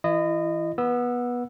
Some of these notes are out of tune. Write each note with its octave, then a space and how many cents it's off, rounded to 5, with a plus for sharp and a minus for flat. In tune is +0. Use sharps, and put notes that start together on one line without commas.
E3 +0 E4 +30 D#5 -20
B3 -15 E6 +0